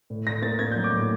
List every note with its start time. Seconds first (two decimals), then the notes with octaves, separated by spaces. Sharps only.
0.10 A2
0.27 A2 A#6
0.42 A#3 A6
0.59 A#3 G#6
0.72 G6
0.75 F#3
0.84 D6
0.92 A2